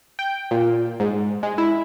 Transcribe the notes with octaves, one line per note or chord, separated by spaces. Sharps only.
G5
A#2
G#2
G#3
E4